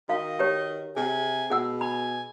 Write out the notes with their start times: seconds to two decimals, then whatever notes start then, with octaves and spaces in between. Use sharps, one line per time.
0.09 D#3 F#4 D#5 F5
0.39 G4 B4 C#5
0.97 C3 G#4 G#5
1.50 B2 G#4 F#5 E6
1.81 G#5 B5